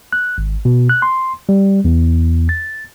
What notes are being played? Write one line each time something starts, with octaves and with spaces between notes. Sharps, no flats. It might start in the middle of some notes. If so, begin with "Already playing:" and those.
F#6
G#1
B2
F#6
C6
G3
E2
A6